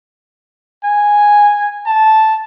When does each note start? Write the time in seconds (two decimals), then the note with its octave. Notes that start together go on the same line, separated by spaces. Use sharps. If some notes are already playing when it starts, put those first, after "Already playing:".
0.84 G#5
1.86 A5